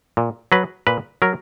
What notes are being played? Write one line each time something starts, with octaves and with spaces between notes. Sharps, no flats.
A#2
F#3 B4
A#2 B4
F#3 A#4